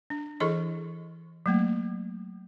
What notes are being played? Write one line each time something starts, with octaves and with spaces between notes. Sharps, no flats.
D4
E3 E4 G#4 A4 D#5 C#6
F#3 A3 A#3